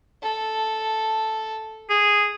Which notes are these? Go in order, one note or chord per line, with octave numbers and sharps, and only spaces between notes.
A4
G#4